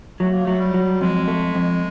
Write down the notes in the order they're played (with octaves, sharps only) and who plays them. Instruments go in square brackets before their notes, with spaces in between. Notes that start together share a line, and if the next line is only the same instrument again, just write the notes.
[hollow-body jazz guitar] F#3 [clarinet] A3
[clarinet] A#3
[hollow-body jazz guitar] F#3 [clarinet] A3
[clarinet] G3
[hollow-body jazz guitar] F#3
[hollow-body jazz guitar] F2 [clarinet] G#3
[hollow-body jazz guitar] A3
F2